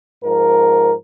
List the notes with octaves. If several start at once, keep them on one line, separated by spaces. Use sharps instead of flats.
G#2 F3 A#4